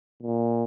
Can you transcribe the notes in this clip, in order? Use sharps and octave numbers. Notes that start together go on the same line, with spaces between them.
A#2